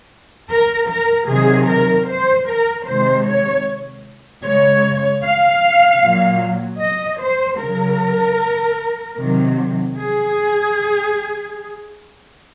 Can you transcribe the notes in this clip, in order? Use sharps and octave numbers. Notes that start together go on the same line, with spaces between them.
A#4
A#4
C3 D#3 F#3 G#4
A#4
C5
A#4
C3 D#3 G#3 C5
C#5
C#3 G#3 C#5
F5
A#2 F#3
D#5
C5
C#3 F#3 A#4
C3 D#3 F#3
G#4